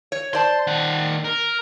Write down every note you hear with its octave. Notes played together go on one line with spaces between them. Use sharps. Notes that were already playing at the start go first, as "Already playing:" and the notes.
C#5
C5 D5 A5 C6
D#3 F#5
A#4